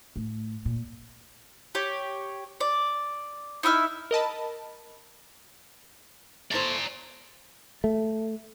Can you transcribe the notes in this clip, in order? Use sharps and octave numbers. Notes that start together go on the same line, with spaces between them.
A2
A#2
G4 C#5
D5
D#4 E4 E5 F6
A#4 D#5 A5 B5
A3 E4 C5 D5 A#5
A3